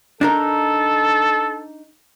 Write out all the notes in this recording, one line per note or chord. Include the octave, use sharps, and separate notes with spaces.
D4 D#4 A4 A#4